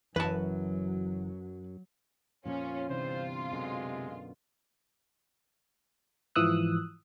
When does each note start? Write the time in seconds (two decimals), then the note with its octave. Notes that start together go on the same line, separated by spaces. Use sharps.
0.16 F#1 F#2 E3 F#3 B4 A5
2.45 F2 A#2 F3 C#4 F4
2.89 G1 C3 E3 D4 F4 C5
3.53 F#2 B2 D3 G#3
6.36 G#2 E3 F3 D#6 E6 F#6